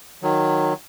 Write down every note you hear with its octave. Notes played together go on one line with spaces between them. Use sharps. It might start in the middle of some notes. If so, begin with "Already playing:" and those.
D#3 F#3